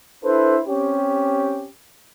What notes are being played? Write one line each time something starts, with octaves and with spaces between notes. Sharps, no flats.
D4 E4 A4 B4 C5
C4 C#4 G4